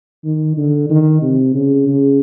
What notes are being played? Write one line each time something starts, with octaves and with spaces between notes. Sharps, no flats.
D#3
D3
D#3
C3
C#3
C#3